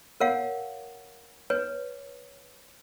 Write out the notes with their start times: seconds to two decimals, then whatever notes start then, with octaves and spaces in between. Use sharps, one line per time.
0.20 A#4 C#5 F5 F#5
1.50 B4 C#5